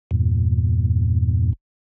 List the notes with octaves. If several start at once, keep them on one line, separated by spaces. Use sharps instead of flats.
E2 G2 A#2